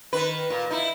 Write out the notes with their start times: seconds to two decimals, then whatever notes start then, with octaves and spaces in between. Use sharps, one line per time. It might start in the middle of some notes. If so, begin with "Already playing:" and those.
0.13 D#3 B4
0.50 A#2
0.70 D#4 E4